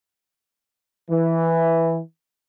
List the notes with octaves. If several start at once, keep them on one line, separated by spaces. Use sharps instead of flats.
E3